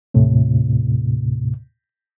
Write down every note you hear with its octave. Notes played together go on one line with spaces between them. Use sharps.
D#2 A2 C3